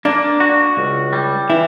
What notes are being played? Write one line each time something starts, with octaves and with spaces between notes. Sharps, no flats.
A#3 D4
F#4
C#2
G3
E3 E4